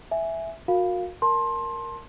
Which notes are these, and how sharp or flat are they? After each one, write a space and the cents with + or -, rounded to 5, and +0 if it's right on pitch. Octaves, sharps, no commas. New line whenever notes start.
E5 +0 G#5 +0
F#4 -30 A#4 -15 F5 +0
A#4 +0 A5 +0 C6 +20